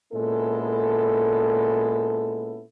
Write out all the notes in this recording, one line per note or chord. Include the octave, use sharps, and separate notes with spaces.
A#2 G#3 B3 C#4 E4 A4